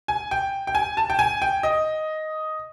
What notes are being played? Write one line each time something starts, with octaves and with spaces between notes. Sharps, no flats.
G#5
G5
G5
G#5
A5
G5
G#5
G5
D#5